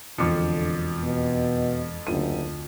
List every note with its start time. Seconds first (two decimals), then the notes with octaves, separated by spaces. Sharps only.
0.18 E1 F2 D3 F3 D6 C#7
1.02 B2
2.07 F#1 D2 F4 D#7